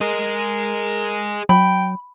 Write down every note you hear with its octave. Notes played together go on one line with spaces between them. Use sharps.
G#4 A#4 D#5
F#3 G5 B5